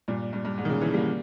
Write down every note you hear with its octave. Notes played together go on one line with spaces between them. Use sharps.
G2 A#2
G2
G2
G#2
D#3
A#2 C#3
C#3 E3
G3 A#3